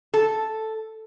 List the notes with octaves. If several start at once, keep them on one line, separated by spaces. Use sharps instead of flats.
A4